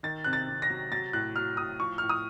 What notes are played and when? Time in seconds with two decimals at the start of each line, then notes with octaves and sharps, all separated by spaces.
0.03 D#3 A6
0.24 C3 F#6
0.33 A6
0.48 C3
0.62 A#6
0.69 F#3
0.92 F#3 A6
1.13 A2 F#6
1.36 F#3 F6
1.57 A2 D#6
1.80 F3 C#6
1.98 A2 F6
2.09 D#6